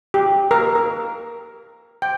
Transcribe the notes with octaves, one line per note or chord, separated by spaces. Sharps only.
G4
A#4
A#4
G5